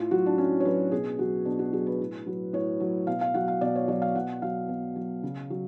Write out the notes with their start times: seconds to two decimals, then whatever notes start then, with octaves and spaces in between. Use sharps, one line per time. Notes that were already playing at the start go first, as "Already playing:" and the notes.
Already playing: A2 F4
0.11 F#3 F#4
0.26 D4
0.38 A2 C#4
0.60 C#5
0.65 F#3 B4
0.92 B2 G#4
1.19 F#3 F#4
1.45 B2 D4
1.59 F#4
1.73 F#3 G#4
1.86 B4
2.00 A2
2.27 F#3
2.53 A2 C#5
2.80 F#3
3.07 B2 F5
3.21 F5
3.34 F#3 F#5
3.48 F5
3.61 B2 D5
3.75 C#5
3.88 F#3 D5
4.02 F5
4.15 B2 F#5
4.42 F#3 F5
4.69 B2
4.96 F#3
5.23 C#3
5.50 F#3